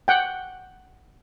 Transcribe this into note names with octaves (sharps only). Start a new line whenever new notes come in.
F#5 G5